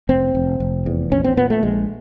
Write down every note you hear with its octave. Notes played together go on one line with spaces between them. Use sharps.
F1 C4
F1
F1
E2
A#1 C#4
C4
A#2 B3
A3
A#1 G#3